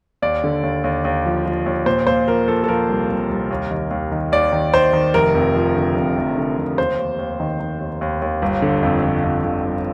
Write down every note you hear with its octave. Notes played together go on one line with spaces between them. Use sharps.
D#2 D5
D3
D#2
D#2
D#2
F3
F3
D#2
A#2 C5
A#2 C5
F3 A#4
F3 A4
A4
F3 A#4
C2
C2
C2
D#2
D#3
D#2
D#3
D#2 D5
D#3
D#3 C5
D#3
F1 A#4
F2
F3
D3
F2
F1
D3
F1
D#2 C5
D#2
D#2
D#3
D#3
D#2
D#2
D#2
G1
D3
F2
G1
F2
D3
G1